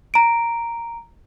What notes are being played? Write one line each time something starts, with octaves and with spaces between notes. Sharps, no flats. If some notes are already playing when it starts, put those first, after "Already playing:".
A#5 D7